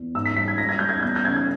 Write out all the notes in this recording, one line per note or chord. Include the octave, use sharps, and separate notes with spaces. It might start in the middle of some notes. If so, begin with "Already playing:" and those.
Already playing: E2
G#2 E6
B6
G3 B6
G#6
G3 A#6
G#6
G3 G6
G#6
E2 G6
G6
C#3 G#6
G#6